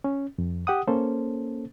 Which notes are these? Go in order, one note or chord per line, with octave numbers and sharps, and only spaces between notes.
C#4
F2
G4 F#5 D#6
A#3 C#4 A4 C5